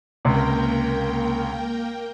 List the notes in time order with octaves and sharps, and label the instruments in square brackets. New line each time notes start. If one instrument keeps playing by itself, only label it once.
[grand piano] C#2 C3 [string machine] A#3 A#4 G5